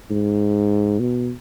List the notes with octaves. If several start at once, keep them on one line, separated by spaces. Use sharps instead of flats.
G#2
B2